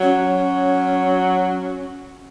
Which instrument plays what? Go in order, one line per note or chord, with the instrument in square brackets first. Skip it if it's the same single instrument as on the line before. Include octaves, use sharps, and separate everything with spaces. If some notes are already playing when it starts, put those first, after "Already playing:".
[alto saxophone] F#3 [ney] C#4